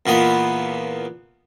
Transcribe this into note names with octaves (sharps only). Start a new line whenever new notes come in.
E2 A#2 B3 D#6